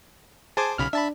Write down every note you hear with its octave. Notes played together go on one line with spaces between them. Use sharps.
G#4 C5 G#5 A5 D6
B1 C#3 B5 F6
D4 E5 A5 B5